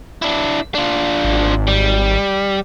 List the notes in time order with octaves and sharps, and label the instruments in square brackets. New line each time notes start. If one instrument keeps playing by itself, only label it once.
[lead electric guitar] D4 E4
D4 F4
[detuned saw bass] G#1
[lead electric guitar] G3